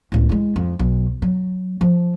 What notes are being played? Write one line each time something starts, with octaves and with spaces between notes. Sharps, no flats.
C#2 A2
G#3 E4
F2
B1
F#3
F3